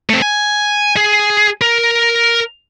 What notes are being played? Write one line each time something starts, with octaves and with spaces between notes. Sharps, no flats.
A3 C4
G#5
G#4
A#4